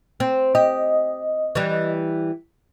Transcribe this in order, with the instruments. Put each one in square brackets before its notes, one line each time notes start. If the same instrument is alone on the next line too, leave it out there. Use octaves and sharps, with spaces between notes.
[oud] C4
[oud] G4 [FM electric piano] D#5
[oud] E3 G3